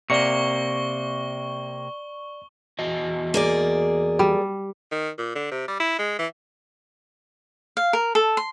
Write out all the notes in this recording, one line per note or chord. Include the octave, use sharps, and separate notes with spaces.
C3 A#3 D5 C#6 C#7 G7
E2 F#4 D#5
A#3 G#4 D5
G3
D#3
A#2
D3
C3
G3
E4
G#3
E3
F5
A#4
A4
C6